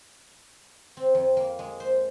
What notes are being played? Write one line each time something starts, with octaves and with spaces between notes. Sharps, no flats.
C4
F2
A#3
G#3
C5